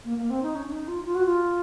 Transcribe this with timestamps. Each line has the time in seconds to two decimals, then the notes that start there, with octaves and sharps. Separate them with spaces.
0.05 A#3
0.18 A#3
0.30 C4
0.43 D#4
0.55 C#4
0.67 C#4
0.72 D#4
0.88 F4
1.05 F4
1.15 F#4
1.26 F4